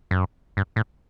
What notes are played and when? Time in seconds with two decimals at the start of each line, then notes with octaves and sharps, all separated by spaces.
0.11 F#2
0.57 G2
0.76 A2